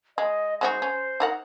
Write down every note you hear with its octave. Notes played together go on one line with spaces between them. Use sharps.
G#3 D#5
G#3 D#4 F#4 C5
C#4
D#4 A#4 F#5